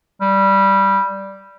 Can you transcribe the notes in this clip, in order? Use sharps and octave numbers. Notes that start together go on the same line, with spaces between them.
G3